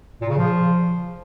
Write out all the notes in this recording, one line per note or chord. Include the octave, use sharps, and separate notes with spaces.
A#2
C#3
F3